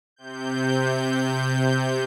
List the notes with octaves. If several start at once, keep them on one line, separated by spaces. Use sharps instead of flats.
C3 G6